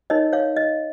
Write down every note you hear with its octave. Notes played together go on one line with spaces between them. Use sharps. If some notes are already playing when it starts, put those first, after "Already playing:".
D#4 A#4 C#5 D#5
C#5 F5
D#5